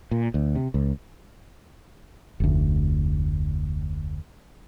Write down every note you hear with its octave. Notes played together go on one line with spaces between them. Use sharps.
A#2
D2
C3
C#2
F1 D2